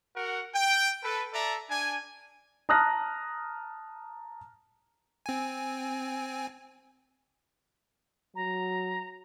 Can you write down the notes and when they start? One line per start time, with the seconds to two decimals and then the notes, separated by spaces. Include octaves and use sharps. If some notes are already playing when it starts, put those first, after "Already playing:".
0.15 F#4 A#4 F#5
0.54 G5
1.02 A4 B4
1.33 A4 D5 E5 A#5
1.70 D4 G#5
2.69 A5 A#5 D#6 F6 F#6 A#6
5.26 C4 G#5
8.35 F#3 A#5